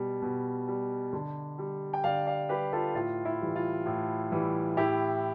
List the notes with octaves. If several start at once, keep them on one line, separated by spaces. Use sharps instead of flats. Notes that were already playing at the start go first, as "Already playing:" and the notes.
Already playing: B2 G3
B2
G3
D3
G3
G5
D3 D5 F5
D5 F5
G3 G4 B4
F4 A4
A2 F4
E4
E3 G3
F4
A2
E3 G3
A2 E4 G4